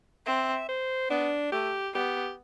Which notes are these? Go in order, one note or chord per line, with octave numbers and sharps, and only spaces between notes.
C4 E5
C5
B3 D4
A3 G4
B3 G4